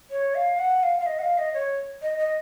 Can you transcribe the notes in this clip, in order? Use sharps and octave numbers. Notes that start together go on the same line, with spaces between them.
C#5
F5
F#5
F5
F5
D#5
F#5
F5
D#5
C#5
D#5
D#5